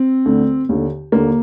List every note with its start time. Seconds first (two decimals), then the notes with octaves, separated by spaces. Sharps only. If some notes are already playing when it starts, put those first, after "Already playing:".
Already playing: C4
0.26 D2 D3
0.69 D#2 D3
1.12 D#2 D3 A#3